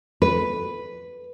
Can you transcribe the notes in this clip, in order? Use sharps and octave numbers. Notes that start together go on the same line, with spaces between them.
B4